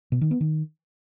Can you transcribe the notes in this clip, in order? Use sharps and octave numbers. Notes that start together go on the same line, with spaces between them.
B2
D#3
B3
D#3